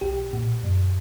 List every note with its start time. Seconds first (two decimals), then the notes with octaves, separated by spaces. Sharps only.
0.01 B1 G4
0.33 A#2
0.63 F#2